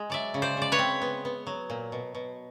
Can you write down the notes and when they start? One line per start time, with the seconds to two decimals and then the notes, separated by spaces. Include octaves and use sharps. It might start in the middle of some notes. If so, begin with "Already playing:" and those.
Already playing: G#3
0.10 F#3 D5 E5
0.34 C#3
0.42 C5 D5
0.57 C#3 D5
0.72 B4 C#5
0.79 C4
1.02 B3
1.25 B3
1.47 F#3
1.70 A#2
1.92 B2
2.15 B2